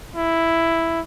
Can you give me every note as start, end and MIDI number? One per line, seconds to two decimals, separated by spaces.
0.16 1.00 64